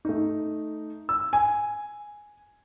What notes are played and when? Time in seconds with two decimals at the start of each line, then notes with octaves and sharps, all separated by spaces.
0.05 A3 D#4
1.09 E6
1.33 G#5